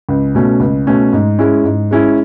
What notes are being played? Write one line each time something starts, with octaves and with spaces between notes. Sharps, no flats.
C#2
B2 A3 C#4
C#2
B2 A3 C#4
G#2
G#3 C#4 E4
G#2
G#3 C#4 E4